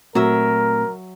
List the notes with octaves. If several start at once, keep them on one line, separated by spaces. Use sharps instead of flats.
A#2 F#3 A3 C4 A#4 E5